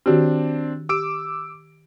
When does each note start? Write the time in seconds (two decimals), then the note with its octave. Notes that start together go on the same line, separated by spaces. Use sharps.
0.06 D#3 C4 D4 F#4 G4
0.89 G4 D6 E6 D7